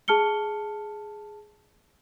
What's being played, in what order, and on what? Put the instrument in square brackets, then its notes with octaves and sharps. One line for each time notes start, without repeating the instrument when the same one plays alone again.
[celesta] G#4 A5 F6 C#7 G7